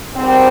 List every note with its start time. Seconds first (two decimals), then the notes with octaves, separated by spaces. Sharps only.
0.16 G#2 D#3 G3 C4